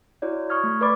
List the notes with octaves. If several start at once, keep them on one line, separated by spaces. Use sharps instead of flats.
E4 F#4 C#5 D5
C#6 D#6 F6 G#6
A3
A#4 B4 D5 B5 D6 A6